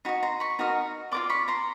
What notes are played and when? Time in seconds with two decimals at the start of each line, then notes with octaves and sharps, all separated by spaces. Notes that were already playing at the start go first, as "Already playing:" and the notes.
0.05 D#4 F#4 D#5 B5
0.23 A#5 C6
0.40 B5 C#6
0.59 D#4 F#4 A#4 D#5
1.11 F4 A#4 D5 C6 D6
1.30 B5 C#6
1.48 A#5 C6